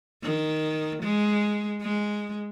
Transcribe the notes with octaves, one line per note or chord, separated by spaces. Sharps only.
D#3
G#3
G#3